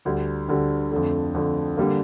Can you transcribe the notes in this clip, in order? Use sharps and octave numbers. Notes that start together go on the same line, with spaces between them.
D2 D3 G3
D2 D3 G3
F2 D3 A3
F2 D3 A3
D3 G3 A#3